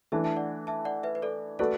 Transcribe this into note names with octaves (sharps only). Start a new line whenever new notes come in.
E3 A3 D4 E5 A5
E5 A5
D5 F#5
E5 A5
D5 F#5
B4 E5
B4
A4 D5
A3 F#4 A4 B4 D5